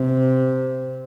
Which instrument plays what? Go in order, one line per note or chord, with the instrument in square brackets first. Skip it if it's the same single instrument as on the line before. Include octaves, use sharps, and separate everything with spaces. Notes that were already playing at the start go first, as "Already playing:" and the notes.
Already playing: [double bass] C3